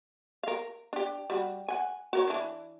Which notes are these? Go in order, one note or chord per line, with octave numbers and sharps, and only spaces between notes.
A#4 F5
D4 G4
G3 F#4
F#5 G#5
F#4 A#4 C#5
E3 D4